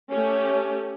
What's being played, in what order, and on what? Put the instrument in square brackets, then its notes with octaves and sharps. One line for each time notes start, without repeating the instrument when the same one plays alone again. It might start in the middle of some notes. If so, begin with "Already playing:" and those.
[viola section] A3 C#4 G4